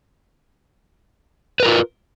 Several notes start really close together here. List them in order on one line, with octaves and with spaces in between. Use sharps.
B4 A#4 F4